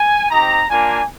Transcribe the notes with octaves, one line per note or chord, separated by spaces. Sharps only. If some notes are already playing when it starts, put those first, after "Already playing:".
Already playing: G#5
C4 D#4 G4 A#5
A#3 D4 F4 G#5